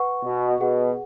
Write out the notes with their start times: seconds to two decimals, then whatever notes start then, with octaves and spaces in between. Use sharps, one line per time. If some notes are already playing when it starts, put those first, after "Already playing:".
Already playing: B4 F#5 C#6
0.24 B2
0.60 B2 G#4 B4 F#5